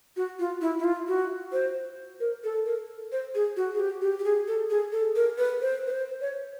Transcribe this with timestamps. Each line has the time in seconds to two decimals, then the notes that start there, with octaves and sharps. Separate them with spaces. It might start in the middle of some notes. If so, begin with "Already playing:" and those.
0.17 F#4
0.39 F4
0.61 E4
0.79 E4
0.84 F4
1.08 F#4
1.53 C5
2.20 A#4
2.44 A4
2.66 A#4
3.12 C5
3.35 G#4
3.57 F#4
3.75 G#4
3.80 G4
4.02 G4
4.19 G4
4.24 G#4
4.48 A4
4.70 G#4
4.92 A4
5.16 A#4
5.38 B4
5.61 C5
5.87 B4
5.91 C5
6.21 C#5